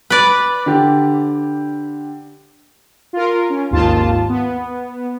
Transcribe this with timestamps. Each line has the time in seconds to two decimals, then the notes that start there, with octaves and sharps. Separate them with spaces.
0.10 B4 D5
0.66 D3 G4
3.13 F4 A#4
3.50 C#4
3.71 G#1 D#2 F4 A5
4.29 B3